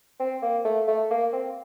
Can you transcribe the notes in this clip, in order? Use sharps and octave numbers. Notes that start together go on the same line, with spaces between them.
C4
A#3
A3
A3
A#3
C4